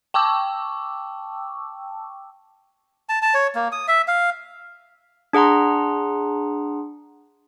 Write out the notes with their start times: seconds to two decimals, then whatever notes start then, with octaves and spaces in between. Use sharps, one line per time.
0.14 G5 A5 C#6 D6 E6
3.09 A5
3.22 A5
3.34 C#5
3.55 A#3
3.72 D#6
3.88 E5
4.08 F5
5.33 D4 G#4 F#5 A#5 C6